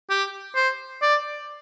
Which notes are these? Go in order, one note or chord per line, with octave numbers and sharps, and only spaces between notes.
G4
C5
D5